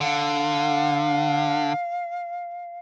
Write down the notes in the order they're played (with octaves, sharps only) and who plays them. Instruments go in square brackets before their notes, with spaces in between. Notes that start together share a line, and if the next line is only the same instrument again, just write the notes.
[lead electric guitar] D3 [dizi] F5